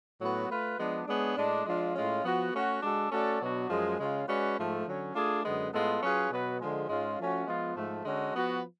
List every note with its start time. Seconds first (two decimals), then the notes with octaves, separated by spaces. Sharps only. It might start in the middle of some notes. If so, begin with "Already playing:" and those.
0.20 A2 F#3 B3 F#4 B4
0.50 A3 F4 B4
0.78 F3 G#3 B3 D4
1.07 G#3 B3 D4 G#4 C#5
1.36 A2 G#3 D4
1.66 F3 G#3 D4 F4
1.95 A2 G#3 C#4 F4
2.23 F3 B3 F#4
2.53 A3 C#4 F#4
2.82 G#3 D4 F#4 A4
3.11 A3 C#4 F#4 A4 D5
3.41 B2 F#3 B3 D4 F#4
3.70 F#2 F3 G#3
3.98 C#3 G#3 C#4 F4
4.27 G#3 C#4 F#4 B4 D5
4.57 G#2 F3 A3
4.85 D3 F#3 C#4
5.15 A3 D4 F4 G#4
5.43 F#2 D3 G#3 B3
5.72 A2 G#3 B3 F4 A4
6.01 F#3 C#4 F4 G#4 B4
6.31 B2 F#3 B3 F#4 B4
6.60 D3 F3 G#3
6.89 G#2 G#3 C#4 F4
7.18 F3 A3 C#4 F#4
7.47 F3 G#3 B3 F4
7.76 G#2 F3 A3
8.05 D3 G#3 C#4 F#4 A4
8.34 F3 B3 F#4 B4